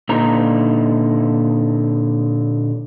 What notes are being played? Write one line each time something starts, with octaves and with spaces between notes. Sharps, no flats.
A#2 D3 D4 D#4 A#5